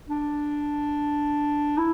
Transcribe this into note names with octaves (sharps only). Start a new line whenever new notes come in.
D4
E4